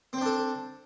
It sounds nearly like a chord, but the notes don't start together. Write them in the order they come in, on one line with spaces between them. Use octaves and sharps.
C4 C5 D4 A4